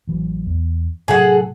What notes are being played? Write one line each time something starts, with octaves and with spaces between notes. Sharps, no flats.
A1 E3 F#3
E2
A2 C3 F#3 G#4 A4 F#5